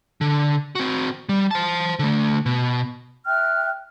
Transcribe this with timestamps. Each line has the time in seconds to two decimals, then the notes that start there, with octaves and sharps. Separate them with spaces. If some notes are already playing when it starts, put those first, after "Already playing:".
0.21 D3
0.75 C4 F#4
1.29 G3
1.51 C5 A5
1.99 D3 A3
2.46 B2
3.26 E5 G5 F6 F#6